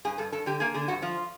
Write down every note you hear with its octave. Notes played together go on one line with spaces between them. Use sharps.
G2 G#4
G2 A4
G2 A4
D3 G4
A#3 G#4
D3 G#4
G2 F#4
F3 F4